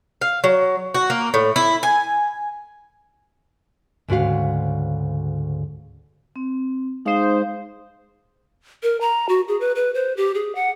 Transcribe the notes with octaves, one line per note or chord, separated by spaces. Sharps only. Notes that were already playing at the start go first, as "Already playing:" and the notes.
F5
F#3
F#4
A#3
A2
E4
G#5
D2 G#2 C#3 F#4 F5
C4
G#3 D#4 C5 F5 D#6
A#4
A#5
F#4
G#4
B4
B4
C5
G4
G#4
F#5